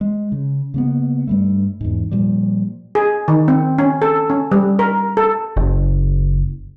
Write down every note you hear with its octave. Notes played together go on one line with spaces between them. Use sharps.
G#3
C#3
C#3 A#3 B3
G2 G3 A3
E2 G#2
A#2 F3 G3
G#4
D#3
C4
C#4
A4
C#4
G3
A#4
A4
F#1